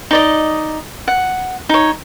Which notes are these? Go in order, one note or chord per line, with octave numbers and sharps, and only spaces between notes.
D#4 D5 D#5
F#5
D#4 C#5